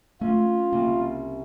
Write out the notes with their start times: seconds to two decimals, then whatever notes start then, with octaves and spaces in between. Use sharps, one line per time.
0.21 A3 C#4 F4
0.73 C2 A#3